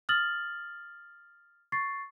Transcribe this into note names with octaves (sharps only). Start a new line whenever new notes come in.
D#6 F6 A6 F#7
C#6 A6 C7